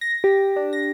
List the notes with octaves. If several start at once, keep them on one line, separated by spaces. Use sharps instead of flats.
A#6
G4
D4
A#6